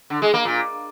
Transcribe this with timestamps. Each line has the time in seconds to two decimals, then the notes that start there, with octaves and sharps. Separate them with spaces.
0.10 D3
0.22 G#3
0.34 A#3
0.45 A#2